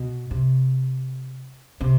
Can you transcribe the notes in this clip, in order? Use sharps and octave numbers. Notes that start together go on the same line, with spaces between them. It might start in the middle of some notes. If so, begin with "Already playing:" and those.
Already playing: B2
C3
C3